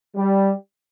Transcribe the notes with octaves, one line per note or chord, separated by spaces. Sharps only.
G3